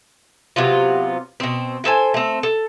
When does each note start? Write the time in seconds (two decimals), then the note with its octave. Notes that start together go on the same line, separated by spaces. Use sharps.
0.56 C3 F#3 B3 F4
1.40 B2 C4
1.84 E4 A4 C5 G#5
2.14 A3 C4
2.43 A4